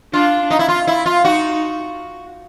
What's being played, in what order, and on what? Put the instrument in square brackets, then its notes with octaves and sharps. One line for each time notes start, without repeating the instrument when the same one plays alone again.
[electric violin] D4 [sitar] F4
[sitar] D#4
E4
F4
E4
F4
[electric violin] D#4 [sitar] F#4